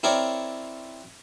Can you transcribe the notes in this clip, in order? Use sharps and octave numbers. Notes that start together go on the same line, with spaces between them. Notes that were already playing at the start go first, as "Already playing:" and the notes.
C4 E4 A#4 C#5 D5